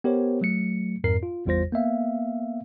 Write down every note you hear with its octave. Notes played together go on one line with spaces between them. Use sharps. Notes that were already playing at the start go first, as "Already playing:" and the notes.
B3 G4 A#4 C5 C#5
F#3 A3 C#7
F2 G#2 C4 A#4 C7
F4
G#1 E2 G3 F4 C5 A#6
A#3 B3 E5 F5